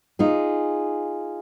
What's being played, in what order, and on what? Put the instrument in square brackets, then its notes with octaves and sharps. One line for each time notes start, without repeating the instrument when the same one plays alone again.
[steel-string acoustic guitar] D#4 F4 G#4